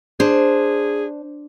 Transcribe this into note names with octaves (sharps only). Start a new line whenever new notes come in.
D4 G#4 C5